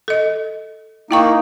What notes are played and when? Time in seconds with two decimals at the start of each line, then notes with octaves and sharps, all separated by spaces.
0.08 A4 D#5
1.11 A#3 D#4 E4 G5 C#6